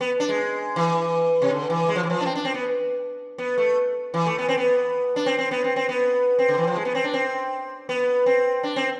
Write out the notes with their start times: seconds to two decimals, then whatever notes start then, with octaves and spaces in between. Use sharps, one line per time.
0.01 B3
0.20 D4
0.29 G#3
0.76 E3
1.42 C3
1.51 D3
1.70 E3
1.89 G#3
1.96 F3
2.03 E3
2.10 F3
2.21 D4
2.26 C4
2.35 D4
2.45 C4
2.54 B3
3.38 B3
3.58 A3
4.14 E3
4.26 A3
4.38 B3
4.49 C4
4.57 B3
5.16 D4
5.26 C4
5.39 C4
5.51 B3
5.64 C4
5.76 C4
5.89 B3
6.39 C4
6.49 D3
6.58 E3
6.67 F3
6.76 G#3
6.85 B3
6.95 C4
7.04 D4
7.14 C4
7.89 B3
8.26 C4
8.63 D4
8.76 C4